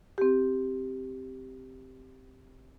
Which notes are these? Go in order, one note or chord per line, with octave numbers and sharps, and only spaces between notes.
C4 G4